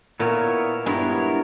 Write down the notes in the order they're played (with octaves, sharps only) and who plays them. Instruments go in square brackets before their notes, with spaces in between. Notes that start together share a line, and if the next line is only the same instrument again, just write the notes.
[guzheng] A#2 [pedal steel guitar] B3 E4 A#4 C#5
[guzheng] G2 [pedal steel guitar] G#3 B3 E4 A#4 C#5